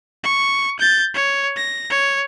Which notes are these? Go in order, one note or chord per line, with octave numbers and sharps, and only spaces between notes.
C#6
G6 A6
C#5
A#6
C#5